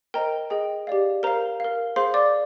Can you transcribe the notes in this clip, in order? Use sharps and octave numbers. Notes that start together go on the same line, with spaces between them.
A#4 C5 D#5 G5 A#5
G#4 D#5 G5
G4 D5 F5
A#4 C5 F5 A#5
A#4 F5
G#4 C5 F5 C6
D5 D6